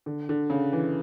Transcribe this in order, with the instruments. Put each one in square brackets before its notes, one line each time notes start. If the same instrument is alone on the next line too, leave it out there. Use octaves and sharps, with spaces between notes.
[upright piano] D3
D3
C#3
E3